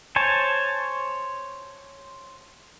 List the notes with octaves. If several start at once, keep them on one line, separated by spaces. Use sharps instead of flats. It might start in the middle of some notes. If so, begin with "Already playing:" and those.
C5 C#5 G#5 A5